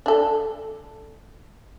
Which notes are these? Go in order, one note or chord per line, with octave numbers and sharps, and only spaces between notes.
D4 A4